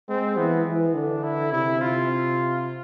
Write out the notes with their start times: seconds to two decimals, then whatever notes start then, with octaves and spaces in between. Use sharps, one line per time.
0.09 G#3 C4
0.37 E3 B3
0.66 E3
0.94 D3 D4
1.23 E4
1.52 C3 E4
1.80 C3 F4